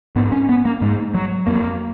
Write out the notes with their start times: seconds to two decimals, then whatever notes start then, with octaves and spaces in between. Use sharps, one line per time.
0.16 G#2 B3
0.32 C#4
0.49 B3
0.65 A#3
0.82 G#2 G#3
1.14 F#3
1.47 F2 A#3